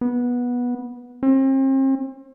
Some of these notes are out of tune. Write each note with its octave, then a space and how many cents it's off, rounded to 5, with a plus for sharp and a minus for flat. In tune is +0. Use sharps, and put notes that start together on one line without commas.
B3 -15
C4 +40